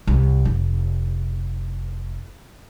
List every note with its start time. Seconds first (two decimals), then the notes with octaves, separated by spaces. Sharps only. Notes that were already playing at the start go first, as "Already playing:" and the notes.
0.07 C2
0.45 F1